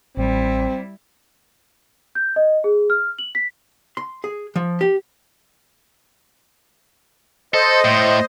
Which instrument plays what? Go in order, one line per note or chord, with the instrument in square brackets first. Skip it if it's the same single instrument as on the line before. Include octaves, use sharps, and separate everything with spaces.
[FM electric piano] A1 [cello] G3 E4 [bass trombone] C4
[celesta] G6
D#5
G#4
F6
F#7
B6
[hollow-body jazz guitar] C6
G#4
F3
G4
[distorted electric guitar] A4 [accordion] C5 D#5
[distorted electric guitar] A2